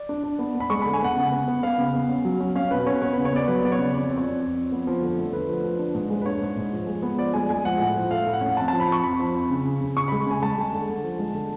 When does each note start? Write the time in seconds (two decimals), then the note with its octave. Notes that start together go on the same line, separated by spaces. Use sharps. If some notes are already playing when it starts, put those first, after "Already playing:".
Already playing: D5
0.09 D4
0.24 D4
0.39 B3
0.55 B3
0.60 B5
0.70 G#3 C#6
0.82 D3 B5
0.93 G#5
1.02 B3 F#5
1.17 C#3
1.32 B3
1.48 B3
1.63 B3 F5
1.78 C#3
1.93 B3
2.09 C#4
2.25 F#3
2.40 C#4
2.55 C#4 F5
2.71 B2 B4
2.87 C#4 C#5
3.01 B3 C#5
3.13 C#3 B4
3.25 C#5
3.33 B3 D5
3.48 F#3 B4
3.63 B3 D5
3.72 C#5
3.79 C#3
3.94 F2 D5
4.09 F2
4.18 C#5
4.26 F2
4.41 F2
4.56 F2
4.72 B3
4.87 F3
5.02 D3
5.18 A3
5.33 D3 B4
5.48 F3
5.64 F3
5.79 D4
5.95 G#2
6.10 G#3
6.22 B4
6.26 D4 C#5
6.41 G#2
6.57 G#2
6.72 F3
6.87 G#3
7.02 B3
7.18 F3 D5
7.34 G#3 G#5
7.49 G#3 G#5
7.64 F3 F#5
7.80 A2
7.96 F3
8.11 A3 F5
8.26 A2
8.33 F#5
8.41 C#4
8.57 F2 A5
8.68 F3 A5
8.80 B5
8.88 F2 C#6
9.03 F2 B5
9.19 F3
9.35 F2
9.50 C#3
9.65 C#3
9.81 C#3
9.96 C#3 C#6
10.08 G#3 B5
10.26 C#3 G#5
10.42 G#3 A5
10.58 G#3
10.73 D3
10.89 D3
11.04 F3
11.19 G#3
11.35 D3